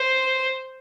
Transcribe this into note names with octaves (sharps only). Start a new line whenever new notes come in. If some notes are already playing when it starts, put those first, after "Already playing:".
Already playing: C5